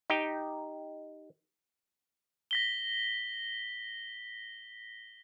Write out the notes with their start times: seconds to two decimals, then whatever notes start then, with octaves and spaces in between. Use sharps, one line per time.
0.10 D#4 G4 G5
2.51 A#6 B6 G7